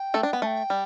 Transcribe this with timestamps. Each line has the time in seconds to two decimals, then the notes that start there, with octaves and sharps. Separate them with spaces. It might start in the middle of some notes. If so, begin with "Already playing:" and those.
Already playing: G5
0.14 A3 A4
0.23 D4
0.33 B3
0.42 A3 A5
0.47 G5
0.70 G3